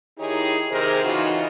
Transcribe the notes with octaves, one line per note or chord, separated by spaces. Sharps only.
D#3 D#4 E4 G4 G#4 C#5
C3 D#3 G#4 A#4 C5
C#3 E3 D#4 F4 F#4